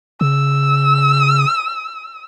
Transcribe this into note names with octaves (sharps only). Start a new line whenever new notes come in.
C#3 E6